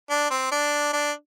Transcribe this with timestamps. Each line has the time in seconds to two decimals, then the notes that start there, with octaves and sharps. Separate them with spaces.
0.10 D4
0.31 C4
0.52 D4
0.93 D4